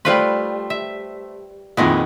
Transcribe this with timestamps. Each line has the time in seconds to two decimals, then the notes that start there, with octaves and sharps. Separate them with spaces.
0.05 G3 A3 F4 B4 C5 C6
0.70 E5
1.77 F2 A#2 D#3 G#3 B3 E4